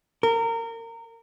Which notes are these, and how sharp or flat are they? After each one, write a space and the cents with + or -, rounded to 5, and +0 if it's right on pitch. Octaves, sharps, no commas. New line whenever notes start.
A#4 -25